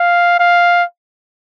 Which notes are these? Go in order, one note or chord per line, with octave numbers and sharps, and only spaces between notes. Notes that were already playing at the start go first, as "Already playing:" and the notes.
Already playing: F5
F5